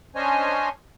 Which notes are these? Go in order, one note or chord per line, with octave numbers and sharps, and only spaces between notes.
C#4 D4 C5 C#5 D#5 G#5